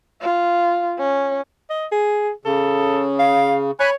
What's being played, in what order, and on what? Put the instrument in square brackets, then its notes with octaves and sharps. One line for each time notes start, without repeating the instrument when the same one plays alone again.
[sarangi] F4
C#4
[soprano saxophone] D#5
G#4
[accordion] C#3 [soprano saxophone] A4
[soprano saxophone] F5
[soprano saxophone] C#5 [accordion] G#5 B5 F#6